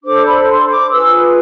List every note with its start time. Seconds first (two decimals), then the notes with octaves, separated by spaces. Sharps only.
0.03 D4 A4 C5 D6
0.25 B5
0.48 C6
0.69 D6
0.91 F4 G#4 B4 E6